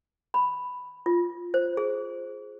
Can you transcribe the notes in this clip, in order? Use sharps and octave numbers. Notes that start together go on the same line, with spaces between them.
B5
F4
C5
G#4